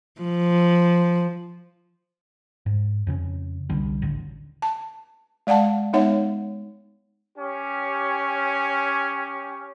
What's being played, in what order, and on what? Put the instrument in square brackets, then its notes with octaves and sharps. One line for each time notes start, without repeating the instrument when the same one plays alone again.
[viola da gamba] F3
[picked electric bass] G#2
F2 C#3 C#4
C2 D3 G3
A1 D2 D3
[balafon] A5
G#3 D5 F5 F#5 A5
G#3 B3 D#4 C#5 E5 F#5
[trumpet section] C#4 G4